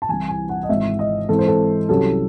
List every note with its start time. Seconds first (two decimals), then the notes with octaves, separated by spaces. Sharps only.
0.02 A5
0.09 C2 C3 E3 G#5
0.29 G#5
0.49 F#5
0.63 D#5
0.69 G#1 G#2 E3 E5
0.99 D#5
1.29 G#2 E3 C4 A4
1.39 C5
1.48 A4
1.89 C2 C3 F#3 C#4 A4